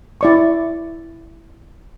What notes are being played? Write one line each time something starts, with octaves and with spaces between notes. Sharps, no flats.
E4 D5 C#6